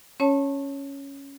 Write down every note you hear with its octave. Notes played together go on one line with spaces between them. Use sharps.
C#4 C#5 A5